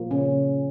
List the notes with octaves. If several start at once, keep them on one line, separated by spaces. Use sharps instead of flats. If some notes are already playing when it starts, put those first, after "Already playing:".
Already playing: A#2 F3 A#3
C#3 C#4